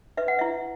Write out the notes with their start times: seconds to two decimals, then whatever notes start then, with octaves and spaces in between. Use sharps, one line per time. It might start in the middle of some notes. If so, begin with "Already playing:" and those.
0.17 B4 E5
0.28 F#5
0.39 E4 E5